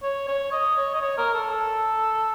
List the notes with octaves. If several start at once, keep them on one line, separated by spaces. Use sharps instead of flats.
C#5
C#5
D#5
C#5
D#5
C#5
A#4
A4
A4